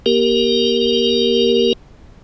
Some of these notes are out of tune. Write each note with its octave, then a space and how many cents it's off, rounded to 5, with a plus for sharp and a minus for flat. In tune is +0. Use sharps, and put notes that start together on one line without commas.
A#3 +35 G4 +0 A#4 +0